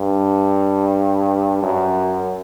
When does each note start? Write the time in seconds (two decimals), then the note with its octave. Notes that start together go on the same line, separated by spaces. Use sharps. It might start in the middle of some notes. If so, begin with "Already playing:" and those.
Already playing: G2
1.62 F#2